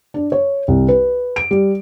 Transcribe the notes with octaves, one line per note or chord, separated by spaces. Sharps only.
D4
C#5
C2
B4
D7
G3